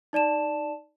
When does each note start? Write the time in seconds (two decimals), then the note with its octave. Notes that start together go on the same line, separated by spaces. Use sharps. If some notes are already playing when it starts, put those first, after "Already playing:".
0.13 D#4 D5 A5 E7